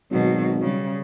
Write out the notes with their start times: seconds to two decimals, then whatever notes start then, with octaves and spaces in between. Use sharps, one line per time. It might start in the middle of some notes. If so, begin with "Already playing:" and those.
0.11 G#1 B2 F#3
0.61 C#3 G3